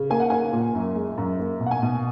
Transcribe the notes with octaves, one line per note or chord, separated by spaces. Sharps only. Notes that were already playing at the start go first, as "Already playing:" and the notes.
Already playing: C#3
A#3 G#5
F#5
A#3 G#5
A#2
F#2
G#3
F#2
A#3
B2
F#5
G#5
B2